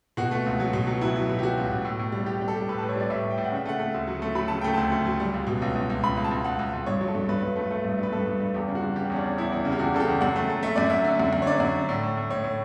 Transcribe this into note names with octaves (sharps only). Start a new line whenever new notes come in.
B2 F#4
A3
C#2
F#3
B2
F#3
F#3 E4
F#3
B2
G4
F#3 F#4
C#2
B2
A2
A2
G3
G3 G4
G3 G4
A4
G3
A2 B4
A5
A2
C#5
G3 D5
A2 E5
A2
G5
A2
F#5
C#3 E5
A3 F#5
A3
D2
F#3
A3
F#3 B5
C#3 A5
A3 G5
D2 A5
D2
F#3
G3
C#2
B2
C#2
C#2
C#2
C#2 B5
C#2
A5
C#2
C#2 F#5
C#2
C#2
G2 C#5
F#3
A4
G2
G2 B4
G2
A3
A3
G2
G2 B4
G2 A4
G2
G2
E2 G4
C#3
F#4
G3
C#3 G4
E2 C#4
D4
E2
E2 E4
E2
C#3
G4
E2 F#4
C#3 A4
G4
E2
F#2 F#5
A3
A3
A3 E5
F#2 D5
F#2 E5
D3
F#2
F#2
C#5
D3 D5
F#2
D3
A2
A2
A2
A2 C#5
A2